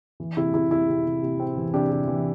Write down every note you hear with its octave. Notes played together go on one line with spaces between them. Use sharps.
E3
C3 E4
C3 E4
C3 E4
C3
C3
C3
C4
E3
C3 D4 G4
C3
E3